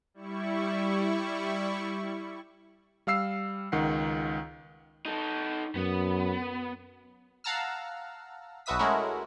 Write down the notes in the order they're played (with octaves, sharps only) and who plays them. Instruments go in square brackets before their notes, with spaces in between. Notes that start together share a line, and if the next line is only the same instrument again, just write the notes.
[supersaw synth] G3 E4 C#6
[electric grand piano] G3 F5 E6 C7
C#2 D#3 F#5 C7
[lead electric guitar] D#4 A4
[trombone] F#2 [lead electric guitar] B3
[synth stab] F5 F#5 A5 A#5 E6 F6
B1 F#4 B4 E5 D#6 B6
G#3 A3 C#4 E4 F#4 A#4